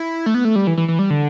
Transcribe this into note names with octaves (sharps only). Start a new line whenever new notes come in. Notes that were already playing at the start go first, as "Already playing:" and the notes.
Already playing: E4
A3
B3
A3
G3
E3
E3
E3
G3
D3